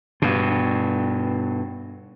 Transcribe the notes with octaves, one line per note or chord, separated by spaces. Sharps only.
G2 B2